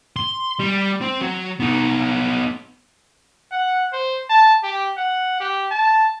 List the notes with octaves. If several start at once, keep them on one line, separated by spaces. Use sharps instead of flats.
C6
G3
C4
F#3
B3 D#4
F#5
C5
A5
G4
F#5
G4
A5